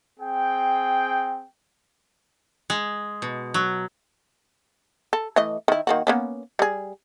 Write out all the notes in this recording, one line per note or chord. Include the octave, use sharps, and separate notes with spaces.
C4 G#4 G5
G#3
B2
F#3
A4
E3 A3 D#5
D#3 E4
D#3 A#3 F#4
A#3 B3 C#4
G3 G#4